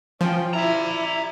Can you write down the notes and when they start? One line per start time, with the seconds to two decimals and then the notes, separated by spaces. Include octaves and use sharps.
0.21 F3 C#4 G5
0.53 E4 D5 E5 A#5